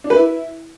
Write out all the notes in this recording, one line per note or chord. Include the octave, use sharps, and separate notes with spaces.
D4
B4
E4